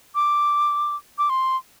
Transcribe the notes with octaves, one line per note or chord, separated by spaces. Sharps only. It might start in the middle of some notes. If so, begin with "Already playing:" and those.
D6
D6
C6